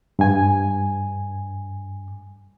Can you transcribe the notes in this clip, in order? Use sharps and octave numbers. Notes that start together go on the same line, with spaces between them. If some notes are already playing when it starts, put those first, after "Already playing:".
G2 G#5